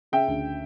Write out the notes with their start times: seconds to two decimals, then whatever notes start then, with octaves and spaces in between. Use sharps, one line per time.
0.12 C#3 E5 G5
0.28 D2